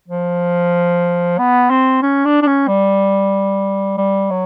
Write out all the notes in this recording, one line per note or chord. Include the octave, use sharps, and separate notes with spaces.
F3
B3
C4
C#4
D4
D4
C#4
G3
G3
F#3